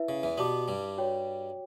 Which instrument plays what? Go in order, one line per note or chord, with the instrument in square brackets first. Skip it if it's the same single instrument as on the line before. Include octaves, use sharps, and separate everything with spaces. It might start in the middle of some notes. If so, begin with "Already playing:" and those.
Already playing: [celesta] E4 B4 E5
[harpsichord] C#3
E2 E3
[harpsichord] B2 B3 [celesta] G4 D5 A5 D6
[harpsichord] G2 G3
[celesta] F#4 C#5 G5